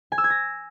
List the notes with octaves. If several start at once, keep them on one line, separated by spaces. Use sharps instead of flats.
G#5
E6
G#6
A#6